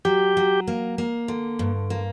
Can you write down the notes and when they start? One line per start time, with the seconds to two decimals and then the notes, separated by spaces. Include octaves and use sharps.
0.05 F#3 G4
0.37 F#3
0.67 A#3
0.98 A#3
1.28 D3
1.59 G2
1.90 A#3